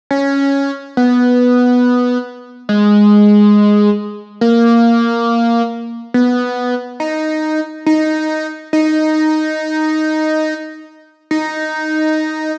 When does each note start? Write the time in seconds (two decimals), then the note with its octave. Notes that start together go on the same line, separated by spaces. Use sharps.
0.11 C#4
0.97 B3
2.69 G#3
4.41 A#3
6.14 B3
7.00 D#4
7.86 D#4
8.73 D#4
11.31 D#4